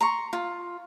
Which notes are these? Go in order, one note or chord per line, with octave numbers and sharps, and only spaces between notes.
A#5 C6 C#6
F4